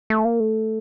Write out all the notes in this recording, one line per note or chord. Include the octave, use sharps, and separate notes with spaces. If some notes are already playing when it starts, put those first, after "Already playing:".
A3
A#3
A3